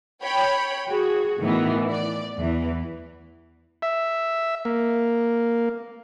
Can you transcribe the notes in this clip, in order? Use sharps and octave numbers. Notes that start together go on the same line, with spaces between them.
C#5 G5 B5
F#4 G#4
A2 D#3 E3 B3
D5
E2 E3
E5
A#3